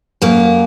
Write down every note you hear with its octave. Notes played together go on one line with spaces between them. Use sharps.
F#2 A#3